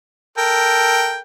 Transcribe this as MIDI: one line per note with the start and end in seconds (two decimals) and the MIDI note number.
0.38 1.20 69
0.38 1.20 70
0.38 1.20 79